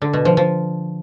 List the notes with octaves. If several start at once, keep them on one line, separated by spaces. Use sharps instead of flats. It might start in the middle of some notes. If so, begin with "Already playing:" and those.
D3
B2
F3
F3